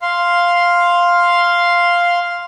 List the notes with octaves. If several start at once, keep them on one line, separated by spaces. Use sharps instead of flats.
F5 C6